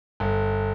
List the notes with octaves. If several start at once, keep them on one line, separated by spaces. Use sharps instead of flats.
G1